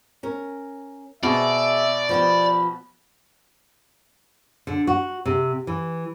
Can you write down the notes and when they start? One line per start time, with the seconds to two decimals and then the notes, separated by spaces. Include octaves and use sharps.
0.23 C#4 A#4
1.23 B2 C4 G#4 D5 E5
2.09 F3 B3 G4 B5
4.67 D3
4.87 F#4
5.25 C3
5.67 E3